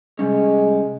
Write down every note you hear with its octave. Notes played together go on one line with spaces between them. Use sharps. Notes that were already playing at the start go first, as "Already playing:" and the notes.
C3 G3 G#3 C#4